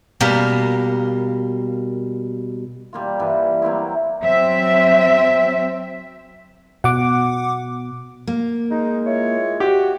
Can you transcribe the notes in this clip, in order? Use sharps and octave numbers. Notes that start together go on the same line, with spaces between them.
B2 G3 A#3 A#4
G3 A#3 F4
G2 E3
F#3 A#3 C4 E4
F#3 C4 E5
B2 F#5 D6
A#3
G#3 D#4
E4 F4 C#5
F#4 G4